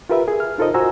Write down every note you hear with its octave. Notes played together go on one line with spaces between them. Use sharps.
F4 G4 A#4 B4 E5
G#4
F6
D#4 F4 A4 A#4 C5 D#5
F4 F#4 C5 G#5 A#5 E6